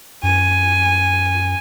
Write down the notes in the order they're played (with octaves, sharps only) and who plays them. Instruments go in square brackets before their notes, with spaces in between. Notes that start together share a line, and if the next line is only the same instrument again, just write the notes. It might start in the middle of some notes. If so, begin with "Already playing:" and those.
[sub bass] F#2 [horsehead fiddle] G#5